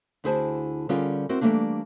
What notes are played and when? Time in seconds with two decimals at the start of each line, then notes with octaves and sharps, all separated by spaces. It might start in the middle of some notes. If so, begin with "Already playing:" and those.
0.24 D2 D3 E4 G#4 C5 A5
0.89 D3 G3 C#4 F4 G#4 A#4
1.29 C4 E4 F#4 A#4
1.41 E3 F#3 G3 A3 A#3 D4